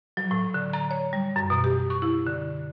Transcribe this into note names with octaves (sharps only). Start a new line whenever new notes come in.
F#3
A2
D3
A#5
C#5
G3
F#2
B2
G4
C#6
E4
D3